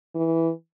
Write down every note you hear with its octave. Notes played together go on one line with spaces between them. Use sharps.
E3